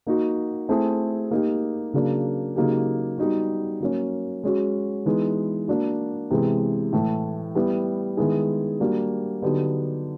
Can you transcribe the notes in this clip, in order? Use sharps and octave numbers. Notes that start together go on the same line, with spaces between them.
A#3 D#4 F#4
A3 C4 E4 G#4
A#3 D#4 G4
C#3 F#3 A#3 D4
C#3 F#3 A#3 D#4 G4
G3 B3 D#4 F#4
F#3 A#3 C#4
G#3 C#4 F#4
E3 G#3 B3 D#4
A#3 D4 F#4
C3 E3 G#3 B3
A2 E3 A3
G3 B3 E4
D#3 G#3 B3 E4 G#4
G3 A#3 D4 F#4
D3 F#3 B3 D#4 G4